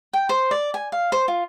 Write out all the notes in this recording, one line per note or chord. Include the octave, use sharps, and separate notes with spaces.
G5
C5
D5
G#5
F5
C5
F4